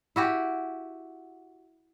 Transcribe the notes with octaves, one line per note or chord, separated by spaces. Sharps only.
E4 F#4 G4